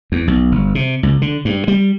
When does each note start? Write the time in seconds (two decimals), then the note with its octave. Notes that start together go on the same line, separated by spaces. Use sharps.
0.12 E2
0.28 B1
0.52 G1
0.75 C3
1.03 C#2
1.22 D3
1.45 G2
1.68 G3